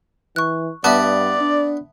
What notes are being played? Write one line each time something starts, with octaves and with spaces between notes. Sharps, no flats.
E3 C#6 F#6
G2 B3 D5 E5 A5
D4